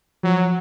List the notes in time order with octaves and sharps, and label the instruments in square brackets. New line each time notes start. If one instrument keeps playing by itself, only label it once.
[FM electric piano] F3 [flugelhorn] F#3